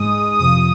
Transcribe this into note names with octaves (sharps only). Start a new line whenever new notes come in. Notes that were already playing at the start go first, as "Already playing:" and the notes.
Already playing: G#2 G#3 D#6
F2 C3 F3 D#6